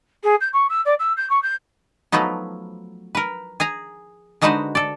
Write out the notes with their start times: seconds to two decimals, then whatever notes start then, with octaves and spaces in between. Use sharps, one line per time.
0.23 G#4
0.40 G6
0.53 C#6
0.69 E6
0.85 D5
0.99 E6
1.17 G6
1.29 C#6
1.42 G6
2.12 F3 F#3 A3 B3 D#4
3.15 A#4 B4
3.60 G#4 G#5 A#5
4.42 D3 G#3 D#4 F#4 B4 C5
4.75 A4 D5